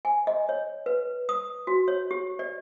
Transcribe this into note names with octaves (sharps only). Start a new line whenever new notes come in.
G#5
D#5
C#5
B4
D#6
F#4
C#5
G4
D5